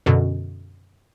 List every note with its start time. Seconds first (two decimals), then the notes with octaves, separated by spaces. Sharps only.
0.06 F#2 B2 D3